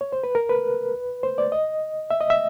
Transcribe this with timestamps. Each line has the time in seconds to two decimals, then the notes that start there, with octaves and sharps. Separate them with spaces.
0.01 C#5
0.12 C5
0.24 B4
0.35 A#4
0.49 B4
1.23 C5
1.38 D5
1.52 D#5
2.10 E5
2.21 D#5
2.30 E5